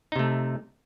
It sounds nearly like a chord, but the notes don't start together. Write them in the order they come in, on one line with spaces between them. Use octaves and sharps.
D#4 C3 A3